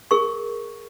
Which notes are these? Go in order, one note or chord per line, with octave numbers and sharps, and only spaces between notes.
G#4 A#4 C#6